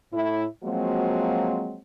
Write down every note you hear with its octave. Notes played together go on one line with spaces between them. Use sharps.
A2 E4
F3 F#3 G#3 A#3 C4 F#4